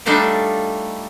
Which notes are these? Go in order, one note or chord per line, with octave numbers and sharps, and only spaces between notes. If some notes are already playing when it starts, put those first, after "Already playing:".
G3 A3 D4 D#4 F4 G4